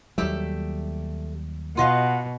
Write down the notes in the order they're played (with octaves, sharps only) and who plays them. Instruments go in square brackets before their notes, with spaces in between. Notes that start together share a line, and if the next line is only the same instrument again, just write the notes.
[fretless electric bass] D#2 F#3 G3 [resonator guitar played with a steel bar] A3 G4 E5
[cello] B2 [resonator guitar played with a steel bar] F4 D#5 F5 [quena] F#5